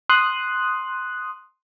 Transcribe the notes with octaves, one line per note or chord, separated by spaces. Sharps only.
C6 D#6 F#6